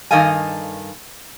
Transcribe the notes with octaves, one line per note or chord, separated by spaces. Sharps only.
G2 D#3 A4 D#5 F5 G#5